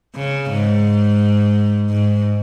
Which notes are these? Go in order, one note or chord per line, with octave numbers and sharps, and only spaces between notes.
C#3
G#2
G#2